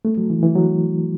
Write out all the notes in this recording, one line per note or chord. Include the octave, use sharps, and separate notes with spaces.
A3
F#3
E3
E3
F#3